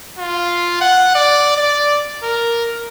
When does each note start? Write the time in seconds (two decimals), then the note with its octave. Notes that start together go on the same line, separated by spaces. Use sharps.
0.19 F4
0.81 F#5
1.15 D5
1.57 D5
2.23 A#4